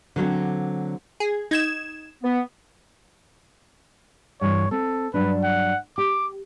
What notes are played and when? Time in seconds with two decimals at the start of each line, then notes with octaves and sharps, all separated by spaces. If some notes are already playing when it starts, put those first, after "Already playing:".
0.16 D3 F#3 A#3 C4
1.20 G#4
1.51 D#4 G#6 E7
2.23 B3
4.41 G2 E3 C#5
4.72 C4 A4
5.14 G2 F#3 D4 B4
5.44 F#5
5.98 G4 D6